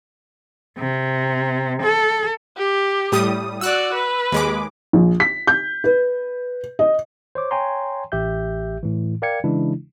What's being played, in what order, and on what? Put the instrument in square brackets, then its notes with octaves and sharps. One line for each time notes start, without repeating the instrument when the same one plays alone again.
[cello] C3
A4
[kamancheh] G4
[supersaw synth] A2 G3 D#6
[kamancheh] F#4 D5 [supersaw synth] E6 F#6
[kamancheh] B4
[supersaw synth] D#2 G#3 D6
[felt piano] A#1
B6
G6
B4
D#5
[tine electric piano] C5 C#5 D6
C#5 G5 G#5 A#5 C6
A1 G4 E5 G6
A2 E3
A#4 D5 F5 G5 G#6 C#7
C#3 E3 G#3 D4 E4